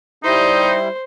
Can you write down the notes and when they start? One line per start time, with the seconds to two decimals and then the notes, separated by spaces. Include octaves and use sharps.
0.24 G3 D#4 E4 C5